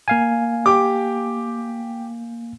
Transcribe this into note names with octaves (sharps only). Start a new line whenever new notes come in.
A#3 F5 G#5
G4 D6